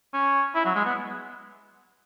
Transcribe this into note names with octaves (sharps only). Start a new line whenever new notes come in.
C#4
E4
F#3
G#3
B3